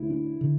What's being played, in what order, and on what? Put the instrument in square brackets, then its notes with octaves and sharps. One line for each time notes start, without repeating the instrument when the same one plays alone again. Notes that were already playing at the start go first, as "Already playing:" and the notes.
Already playing: [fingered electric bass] D2 [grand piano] E4
[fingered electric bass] D4
D3